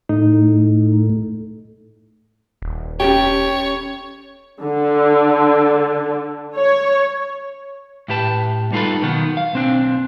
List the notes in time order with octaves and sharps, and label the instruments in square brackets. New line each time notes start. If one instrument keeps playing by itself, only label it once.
[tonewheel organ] A2 [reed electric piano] D#4
[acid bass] D#1
[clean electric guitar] C#4 A4 G5 [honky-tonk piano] G4 [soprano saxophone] C#5
[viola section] D3
C#5
[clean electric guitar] A2 A3 G4 B4 A5
G3 D#4 F4 G#4 A4 B4
B2 D#3 F#3 B3
F5
B1 C4 D4